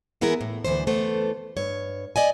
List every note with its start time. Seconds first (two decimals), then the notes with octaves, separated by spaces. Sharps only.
0.21 E3 B3 E4 G#4 A#4
0.41 A2
0.64 D2 E3 G3 C5
0.87 F2 E3 A3 B3 C5
1.57 G2 C#5
2.16 D5 D#5 G#5